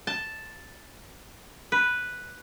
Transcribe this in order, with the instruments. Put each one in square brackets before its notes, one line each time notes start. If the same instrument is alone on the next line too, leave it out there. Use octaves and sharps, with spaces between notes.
[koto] A5
B4